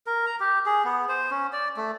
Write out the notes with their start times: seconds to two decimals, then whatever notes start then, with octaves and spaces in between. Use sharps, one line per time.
0.07 A#4
0.26 A#5
0.40 G4
0.66 G#4
0.85 B3
1.09 C5
1.31 C#4
1.53 D5
1.77 A3